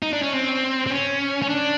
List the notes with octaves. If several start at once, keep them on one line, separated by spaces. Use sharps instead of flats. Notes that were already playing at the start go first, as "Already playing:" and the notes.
D#4
D4
C#4
C4
C4
C#4
C#4
D4